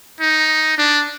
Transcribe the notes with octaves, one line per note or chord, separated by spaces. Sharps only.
D#4
D4